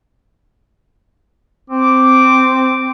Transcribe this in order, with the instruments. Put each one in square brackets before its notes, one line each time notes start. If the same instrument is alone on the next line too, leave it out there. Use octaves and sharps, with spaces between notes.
[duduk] C4 [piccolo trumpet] D6